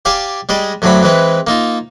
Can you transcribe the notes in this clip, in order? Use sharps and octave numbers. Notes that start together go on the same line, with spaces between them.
G4 D5 F5 G#5 A5
G3 G#3 G#4 D5 D#5
F#2 D3 F#3 A3 C4 B5
E3 G#3 C4 B4
A#3 D#4 F4